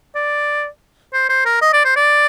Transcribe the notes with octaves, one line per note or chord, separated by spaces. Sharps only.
D5
C5
C5
A#4
D#5
D5
C5
D5